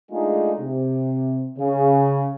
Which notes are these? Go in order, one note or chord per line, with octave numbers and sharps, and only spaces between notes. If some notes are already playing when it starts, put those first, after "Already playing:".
G#3 A3 D4 D#4 F4 G#4
C3
C#3